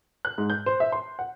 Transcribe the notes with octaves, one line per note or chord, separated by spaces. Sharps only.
F#6
G#2
G6
C5
E5
C6
F#5